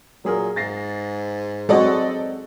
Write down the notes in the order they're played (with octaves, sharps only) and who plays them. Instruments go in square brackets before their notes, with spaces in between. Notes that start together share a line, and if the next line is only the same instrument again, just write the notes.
[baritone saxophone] A#2 [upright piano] F#3 G#4 A#4
[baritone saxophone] G#2 [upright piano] A6 A#6 C7
[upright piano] F#3 C4 [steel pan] G#3 F#4 [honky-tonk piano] A4 D5 D#5